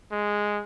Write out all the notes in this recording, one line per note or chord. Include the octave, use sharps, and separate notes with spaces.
G#3